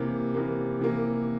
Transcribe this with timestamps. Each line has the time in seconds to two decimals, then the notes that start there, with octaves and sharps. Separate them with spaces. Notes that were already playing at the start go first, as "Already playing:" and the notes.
Already playing: C3 E3 A#3
0.34 C3 E3 A#3
0.79 C3 E3 A#3